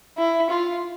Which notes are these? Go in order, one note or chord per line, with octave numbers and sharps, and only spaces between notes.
E4
F4